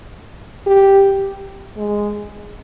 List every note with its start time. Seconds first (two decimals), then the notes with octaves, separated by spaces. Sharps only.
0.67 G4
1.77 G#3